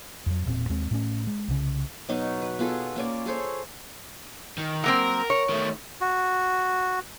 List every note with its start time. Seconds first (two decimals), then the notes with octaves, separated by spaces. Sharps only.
0.26 F2 F#3
0.46 E1 A#2 C4
0.69 D#2 G#3 C4
0.91 A2 A3 C#4
1.27 G#3
1.48 C2 C#3
2.09 B2 F#3 D#4
2.42 B4
2.59 B3 F4 G#4 A4
2.96 A#3 C#4 D5
3.26 G#4 A4 C5 C#5
4.58 D#3
4.84 F#3 A#3 C4 A#4
5.30 C#5
5.49 D#3 A3
6.01 F#4